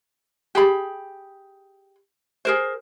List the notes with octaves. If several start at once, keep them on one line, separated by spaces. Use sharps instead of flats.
G4 G#4 B5
G#4 A#4 C5